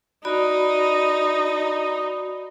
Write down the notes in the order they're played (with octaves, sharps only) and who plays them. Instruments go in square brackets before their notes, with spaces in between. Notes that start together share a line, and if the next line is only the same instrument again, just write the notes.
[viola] D#4 [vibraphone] F#4 D5 B5